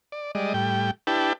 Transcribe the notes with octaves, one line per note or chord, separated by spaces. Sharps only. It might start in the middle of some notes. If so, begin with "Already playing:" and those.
D5
G3 G#3 D5 D#5
A2 G3 G5
D4 E4 G4 B4 G5 A5